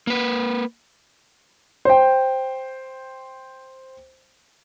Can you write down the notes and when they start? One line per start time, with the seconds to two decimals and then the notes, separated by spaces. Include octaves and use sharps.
0.07 A#3 B4
1.85 C5 G5